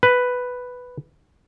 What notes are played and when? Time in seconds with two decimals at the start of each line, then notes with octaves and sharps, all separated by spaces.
0.03 B4